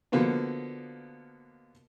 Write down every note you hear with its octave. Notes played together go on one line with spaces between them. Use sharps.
B2 D3 F3 A#3 B3 D4